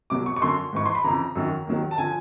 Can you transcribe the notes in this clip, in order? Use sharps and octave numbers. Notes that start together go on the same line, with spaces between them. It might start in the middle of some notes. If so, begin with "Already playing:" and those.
C2 B2 F#3 D6
C#6
C#6
F#2 D3 F#3 C6
G#2 E3 C#6
C6
B5
F2 C#3 E3 A#5
F#2 D#3 F#3
D#2 D#3 F#3
A5
D3 F3 G#5